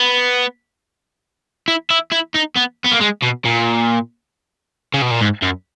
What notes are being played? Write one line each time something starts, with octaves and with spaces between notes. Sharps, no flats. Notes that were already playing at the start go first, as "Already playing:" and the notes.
Already playing: B3
E4
E4
E4
D#4
B3
B3
A#3
G#3
B2
A#2
C#3
B2
A#2
G#2
F#2